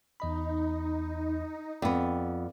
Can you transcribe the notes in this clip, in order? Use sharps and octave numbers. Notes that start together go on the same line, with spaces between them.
E2 D#4 D#5 B5
F2 B3 D5